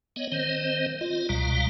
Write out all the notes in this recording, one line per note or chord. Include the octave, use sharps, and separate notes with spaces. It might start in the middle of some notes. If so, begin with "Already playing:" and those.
B3 C#5 D#5
D#3 C4 C5 D#5
F4 D#5
C#2 B2 G3 F5 A#5